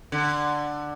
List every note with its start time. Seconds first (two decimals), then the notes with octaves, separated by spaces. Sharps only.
0.12 D3